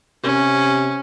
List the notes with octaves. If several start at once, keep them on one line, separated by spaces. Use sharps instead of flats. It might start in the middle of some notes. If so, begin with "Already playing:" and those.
C3 C#4